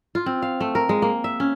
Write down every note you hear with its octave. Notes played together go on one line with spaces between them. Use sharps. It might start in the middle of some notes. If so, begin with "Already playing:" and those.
F4
C4
F5
A3
A#4
G#3
A#3
E5
C#4